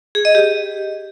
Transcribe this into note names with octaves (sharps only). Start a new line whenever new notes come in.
G#4
D#5
G4